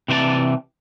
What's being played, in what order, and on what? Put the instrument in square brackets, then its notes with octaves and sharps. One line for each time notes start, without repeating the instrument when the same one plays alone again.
[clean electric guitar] C3 E3 C5 D5 A5